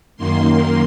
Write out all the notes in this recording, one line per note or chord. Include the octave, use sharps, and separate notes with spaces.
F#2 D#3 A#3 C6